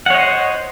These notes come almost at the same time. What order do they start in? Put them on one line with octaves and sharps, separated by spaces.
F#5 C#5 D#5 C5